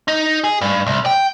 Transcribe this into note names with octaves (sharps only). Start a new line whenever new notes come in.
D#4
G#4
G2
C2
G5